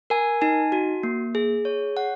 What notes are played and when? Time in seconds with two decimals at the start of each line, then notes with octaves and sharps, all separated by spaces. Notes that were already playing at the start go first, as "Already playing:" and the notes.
0.10 A#4 G#5
0.41 D#4 G#5
0.72 F#4
1.03 A#3
1.35 G#4
1.65 C#5
1.97 F#5